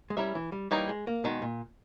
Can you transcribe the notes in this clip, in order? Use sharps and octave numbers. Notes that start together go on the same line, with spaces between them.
G#3
G3 C#4 E4 A#4 E5
E3
G3
E3 G3 A#3 D#4 G4 C#5
G#3
A#3
B2 D#3 G#3
A#2